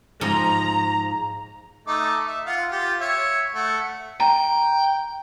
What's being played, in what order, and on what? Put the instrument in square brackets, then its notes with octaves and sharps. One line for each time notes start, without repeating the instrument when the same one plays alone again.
[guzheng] G#2 F3 [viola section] A#5
[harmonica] A3 D#4 D6
E5
F4 F5 F#5
F4 G4
C#5 E5
A3 F#5
[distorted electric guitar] G5 [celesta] A#5